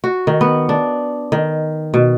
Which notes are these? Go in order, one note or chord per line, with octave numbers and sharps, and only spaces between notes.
F#4
D#3
B3
D4
D#3
B2